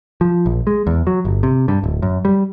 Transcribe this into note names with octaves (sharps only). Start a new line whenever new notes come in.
F3
A#1
G#3
E2
F#3
G1
C3
G2
D1
F#2
G3